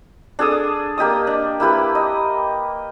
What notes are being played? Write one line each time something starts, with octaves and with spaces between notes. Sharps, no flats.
D4 G#4 A4 D#6
A#3 G4 D#5 D#6
D4
A#3 E4 G4 B4
D#5